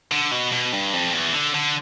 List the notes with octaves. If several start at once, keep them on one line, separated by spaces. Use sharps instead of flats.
D3
B2
B2
G2
F2
E2
D3
D3